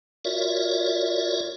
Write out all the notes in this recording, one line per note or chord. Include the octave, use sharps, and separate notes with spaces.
F4 F#4 A#4 C#5 D5 E5